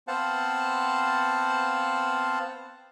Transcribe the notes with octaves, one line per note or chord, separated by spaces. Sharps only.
B3 C4 C5 F5 F#5 A5